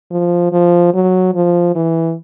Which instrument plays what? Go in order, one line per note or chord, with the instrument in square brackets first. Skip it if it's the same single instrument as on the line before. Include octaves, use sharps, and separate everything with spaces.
[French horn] F3
F3
F#3
F3
E3